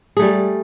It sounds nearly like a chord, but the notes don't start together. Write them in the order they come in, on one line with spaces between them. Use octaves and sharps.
G#4 A3 G3